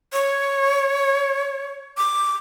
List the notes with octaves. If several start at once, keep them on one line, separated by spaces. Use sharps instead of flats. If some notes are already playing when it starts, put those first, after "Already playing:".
C#5
D6